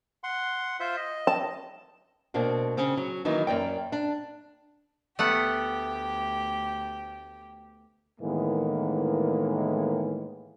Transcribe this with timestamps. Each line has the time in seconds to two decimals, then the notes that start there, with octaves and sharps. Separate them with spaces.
0.24 F#5 C6
0.80 F4 C5 E5
0.97 D#5
1.27 A5
2.34 B2 A#3 C4 D4
2.77 C#3 C4
2.97 F#3
3.25 D#3 E3 F#3 A#3 D#4
3.47 F#2 A#3 D5 G5
3.92 D4
5.19 D2 A3 B3 G4 F#5
8.20 A2 D#3 E3 G#3 A#3 B3